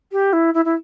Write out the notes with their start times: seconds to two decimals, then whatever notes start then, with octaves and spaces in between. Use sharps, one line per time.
0.12 G4
0.32 E4
0.54 E4
0.65 E4